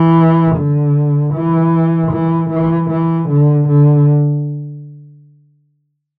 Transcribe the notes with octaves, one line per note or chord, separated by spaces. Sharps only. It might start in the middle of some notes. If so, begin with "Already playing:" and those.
Already playing: E3
D3
E3
E3
E3
E3
D3
D3